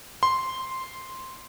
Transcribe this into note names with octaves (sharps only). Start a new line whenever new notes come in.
C6